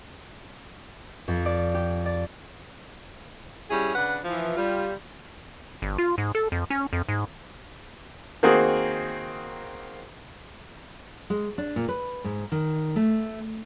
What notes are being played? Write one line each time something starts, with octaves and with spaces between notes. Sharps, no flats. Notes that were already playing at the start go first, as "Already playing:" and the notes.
F2
D5
G4
D5
G3 C#4 E4 G#4
C#3 D4 B4 F#5
E3 F3
G3 F4
G1
F4
G#2
A4
F2
C#4
F2
G#2
D#3 A#3 C4 F#4 G#4
G#3
D4
A#2
B4
G#2
D#3
A3